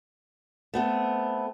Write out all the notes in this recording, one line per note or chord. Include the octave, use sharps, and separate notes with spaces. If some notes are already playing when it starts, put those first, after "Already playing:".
A3 B3 C4